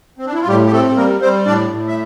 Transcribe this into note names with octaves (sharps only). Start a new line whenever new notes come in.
C4
D4
E4
F4
A2 G3 G4
G4
A3 C4 A4
G3 A#3 A#4
G3 C4 C5
A2 D4 D5
A2
E5